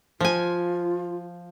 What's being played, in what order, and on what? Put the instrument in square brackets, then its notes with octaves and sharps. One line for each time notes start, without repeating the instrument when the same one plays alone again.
[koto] F3 G#5 [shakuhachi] F4